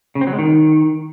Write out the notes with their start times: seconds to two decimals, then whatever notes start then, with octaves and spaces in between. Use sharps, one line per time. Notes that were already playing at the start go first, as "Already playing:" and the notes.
0.15 C#3
0.21 C4
0.27 F#3
0.33 G#3
0.39 D#3